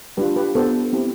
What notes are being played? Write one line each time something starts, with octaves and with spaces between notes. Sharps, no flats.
G3 D4 F4 G4 B4
G4 B4
B3 D4 G4 A4 C5
C4 E4 G4